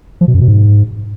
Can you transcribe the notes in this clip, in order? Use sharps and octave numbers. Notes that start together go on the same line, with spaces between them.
F3
B2
F#2
B2
G#2